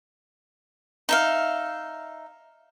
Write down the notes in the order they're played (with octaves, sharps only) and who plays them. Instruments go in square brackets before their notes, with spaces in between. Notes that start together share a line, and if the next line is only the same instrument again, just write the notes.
[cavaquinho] D#4 E5 F5